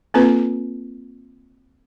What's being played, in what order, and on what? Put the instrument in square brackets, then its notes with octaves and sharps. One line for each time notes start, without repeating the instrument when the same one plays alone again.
[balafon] A#3 C4 F4 A4 B4